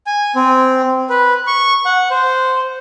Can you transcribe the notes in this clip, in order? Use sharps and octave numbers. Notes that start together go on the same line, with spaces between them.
G#5
C4
B4
C#6
F#5
C5